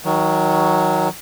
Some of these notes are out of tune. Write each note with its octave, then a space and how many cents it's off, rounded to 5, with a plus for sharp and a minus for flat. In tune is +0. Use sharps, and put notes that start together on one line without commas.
D#3 +30 F#3 +0